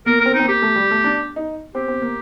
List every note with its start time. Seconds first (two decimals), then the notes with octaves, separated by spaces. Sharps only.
0.06 A#3 A#4
0.20 A#4
0.26 C4
0.34 D#4
0.39 C4
0.43 A#3 G4
0.62 A3
0.76 G3
0.91 A3
1.04 D4
1.36 D#4
1.74 C4 G4
1.88 C4
2.02 A#3